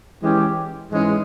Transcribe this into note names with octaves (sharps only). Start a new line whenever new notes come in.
E3 G#3 C#4 G4
G#2 E3 G#3 C#4